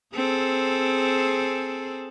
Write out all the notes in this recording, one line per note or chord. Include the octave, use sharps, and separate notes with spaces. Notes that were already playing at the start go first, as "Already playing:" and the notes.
C4 G#4 A4